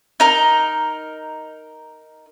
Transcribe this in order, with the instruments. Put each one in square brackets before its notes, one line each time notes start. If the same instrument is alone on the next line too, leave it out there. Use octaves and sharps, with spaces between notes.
[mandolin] D#4 A#4